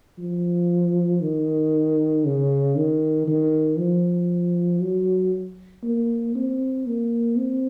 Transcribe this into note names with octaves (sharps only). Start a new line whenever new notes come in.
F3
D#3
C#3
D#3
D#3
F3
F#3
A#3
C4
A#3
C4